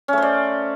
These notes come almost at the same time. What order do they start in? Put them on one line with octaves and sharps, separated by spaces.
C#4 A3 C5 D5